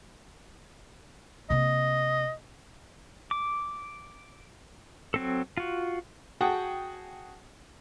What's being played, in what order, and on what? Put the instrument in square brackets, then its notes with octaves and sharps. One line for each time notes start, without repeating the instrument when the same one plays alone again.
[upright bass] C3 A#3 [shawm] D#5
[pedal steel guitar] D6
F#3 C4 A4
F4 F#4
[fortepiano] F#4 G#4 F#5 G5 A5